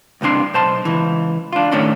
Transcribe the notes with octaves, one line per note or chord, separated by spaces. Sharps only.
C#2 G2 C3 D4 C6
B1 C5 A5 C6
C#2 E3
D4 F4
A2 D#3 C#4 D4